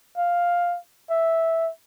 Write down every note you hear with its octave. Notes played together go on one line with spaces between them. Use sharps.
F5
E5